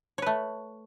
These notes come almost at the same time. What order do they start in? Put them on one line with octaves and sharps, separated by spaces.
C#5 B4 A3